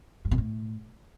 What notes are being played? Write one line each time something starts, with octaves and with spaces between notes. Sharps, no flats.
G2
B2
A2